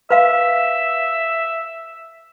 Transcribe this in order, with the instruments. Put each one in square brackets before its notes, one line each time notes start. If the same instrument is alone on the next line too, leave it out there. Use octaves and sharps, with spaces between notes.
[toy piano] B4 F5 [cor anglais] E5